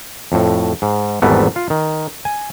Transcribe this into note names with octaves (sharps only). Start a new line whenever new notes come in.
F2 A2
G#2
G#1 E2 G#2 G3 A3 B3
F4
D#3
G#5